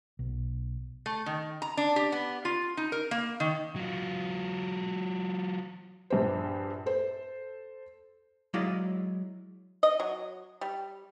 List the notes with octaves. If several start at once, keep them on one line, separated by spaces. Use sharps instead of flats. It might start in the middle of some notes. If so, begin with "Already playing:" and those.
B1
A3
D#3
A#5
D4
G4
B3
F4
D#4
A#4
A#3
D#3
F#3 F4
A#1 G2 C5
A4 C5
F#3 G#3 E4 D5 D#5 F5
D#5
F#3
G3